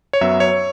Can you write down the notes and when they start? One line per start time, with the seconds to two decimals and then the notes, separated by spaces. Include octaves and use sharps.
0.13 C#5
0.21 F#2 F#3 B3 E5
0.40 C#5